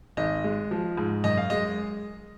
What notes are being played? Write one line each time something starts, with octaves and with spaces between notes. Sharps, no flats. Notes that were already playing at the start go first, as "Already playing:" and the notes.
G#1 D#5
G#3
F3
G#2
F#2 D#5
F5
G#3 D#5